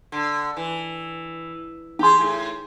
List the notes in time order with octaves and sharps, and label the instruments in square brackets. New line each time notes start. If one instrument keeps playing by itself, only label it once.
[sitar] D3
E3
[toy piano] D#4 C6 [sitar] G4 G#4
[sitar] A2